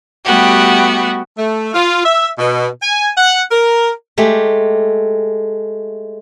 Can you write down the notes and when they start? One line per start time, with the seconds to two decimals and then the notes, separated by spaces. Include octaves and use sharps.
0.25 G3 A3 B3 F#4 G4
1.38 A3
1.74 F4
2.05 E5
2.38 B2
2.82 G#5
3.17 F#5
3.51 A#4
4.18 G#3 A3 G4